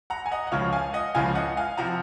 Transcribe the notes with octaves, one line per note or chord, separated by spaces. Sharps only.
F#5 A#5
G#5
D#5 F#5
F#5
C#2 C#3 F3 C#5 F5
F5 G#5
D#5 F#5
C#2 C#3 F3 F5 G#5
D#5 F#5
F5 G#5
C3 F3 F#5 A#5